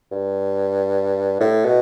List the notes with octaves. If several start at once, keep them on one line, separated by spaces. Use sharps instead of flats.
G2
A2
B2